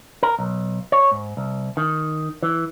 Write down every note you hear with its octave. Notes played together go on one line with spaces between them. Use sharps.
A#4
B1
C#5
G#2
C2
D#3
E3